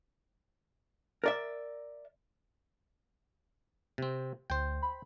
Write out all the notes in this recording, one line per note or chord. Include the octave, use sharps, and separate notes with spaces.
A#4 D5 E5
C3 C4
D2 C5 G5
B5